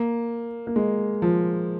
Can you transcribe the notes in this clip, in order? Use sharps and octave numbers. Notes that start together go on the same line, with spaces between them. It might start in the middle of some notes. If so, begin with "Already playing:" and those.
Already playing: A#3
A#3
G#3
F3